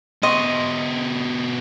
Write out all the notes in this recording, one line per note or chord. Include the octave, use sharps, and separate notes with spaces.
B2 G4 D#5 C6 C#6